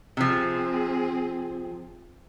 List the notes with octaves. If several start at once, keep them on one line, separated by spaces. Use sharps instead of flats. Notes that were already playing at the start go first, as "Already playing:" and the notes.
C3 F3 C4 G#4